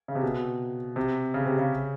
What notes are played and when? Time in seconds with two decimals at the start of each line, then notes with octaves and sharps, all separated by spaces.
0.08 C#3
0.15 C3
0.23 B2
0.96 C3
1.34 C#3
1.46 C3
1.59 C#3